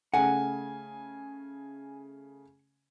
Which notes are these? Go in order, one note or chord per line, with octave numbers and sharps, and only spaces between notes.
C#3 A3 F#5 G#5